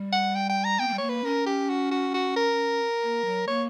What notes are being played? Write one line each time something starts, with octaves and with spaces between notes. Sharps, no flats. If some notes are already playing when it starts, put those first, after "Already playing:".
Already playing: G3
F#5
G5
G5
A#5
B3 G5
A#3
G3
A#3 C#5
B4
C#4 A#4
G4
F#4
F#4
F#4
A#4
A#3
F#3
A#3 C#5